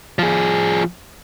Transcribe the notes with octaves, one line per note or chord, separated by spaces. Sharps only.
F3 G#4